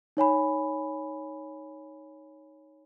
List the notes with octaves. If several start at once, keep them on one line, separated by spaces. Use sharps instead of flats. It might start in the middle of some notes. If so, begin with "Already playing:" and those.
D#4 C#5 G#5 B5